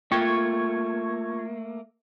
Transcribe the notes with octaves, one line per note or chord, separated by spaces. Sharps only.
A3 A#3 F4 G5 C#6 G#6